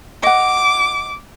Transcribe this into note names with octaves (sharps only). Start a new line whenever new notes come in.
D#5 F#5 D6